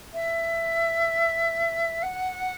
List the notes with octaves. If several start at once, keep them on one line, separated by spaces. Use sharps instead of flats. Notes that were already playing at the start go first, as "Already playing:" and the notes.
E5
F#5